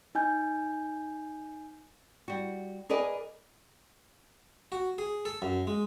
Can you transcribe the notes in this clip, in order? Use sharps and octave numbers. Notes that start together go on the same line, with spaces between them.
D#4 G#5 G6
G3 F#4
G#4 A#4 B4 D5 D#5 G#5
F#4
G#4
A4
F#2
G#3